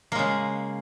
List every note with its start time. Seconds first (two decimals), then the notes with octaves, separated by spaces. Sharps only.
0.12 A#3
0.15 G#3
0.19 C#3